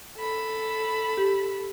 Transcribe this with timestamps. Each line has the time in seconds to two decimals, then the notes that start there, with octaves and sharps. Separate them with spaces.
0.18 A4 B5
1.17 G4